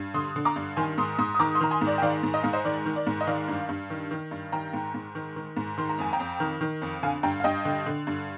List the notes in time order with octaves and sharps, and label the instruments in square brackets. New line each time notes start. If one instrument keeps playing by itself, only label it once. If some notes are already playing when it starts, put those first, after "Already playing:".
Already playing: [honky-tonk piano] G2
D3 C6 D#6
D3
A#5 D6
G2
D#3 G#5 C6
G#2 C6 D#6
G#2 C6 D#6
D#6
D#3 A#5 D6
C6 D#6
D#3 A#5
G#5 C6
G#2
D5
G5
D#3 D5 F5
G#2
D#5
G#2 F5
C5 D#5
D#3 D5
D#3
D5
G#2
D#5
D#3 D5 F5
G2
G2
D#3
D#3
G2
D#3 G5 A#5
G#2
G#2
D#3
D#3
G#2
D#3 C6
A#5
F2 G#5
G5 A#5
F2
D#3
D#3
F2
D3 F5 G#5
G2 G5 A#5
F5
G2 D#5 G5
D3
D3
G2